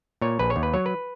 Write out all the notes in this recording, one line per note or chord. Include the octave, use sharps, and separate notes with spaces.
A#2 C#5
A#1 B4
C#5
D#2
B4
F#3 C#5
B4